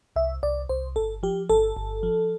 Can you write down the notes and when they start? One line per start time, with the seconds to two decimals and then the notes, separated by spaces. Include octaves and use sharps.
0.16 C2 E5
0.43 C2 D5
0.69 C2 C5
0.96 G1 A4
1.23 F3 G4
1.49 G1 A4
1.77 G1
2.03 F3